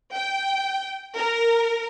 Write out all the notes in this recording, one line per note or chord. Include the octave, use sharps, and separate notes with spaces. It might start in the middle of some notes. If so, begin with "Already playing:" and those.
G5
A#4